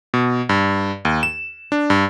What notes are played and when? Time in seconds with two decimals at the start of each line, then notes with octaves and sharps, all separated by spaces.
0.14 B2
0.49 G2
1.05 D#2
1.23 E7
1.72 D4
1.90 G2